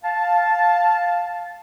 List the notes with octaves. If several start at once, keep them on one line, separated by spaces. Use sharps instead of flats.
F5 A5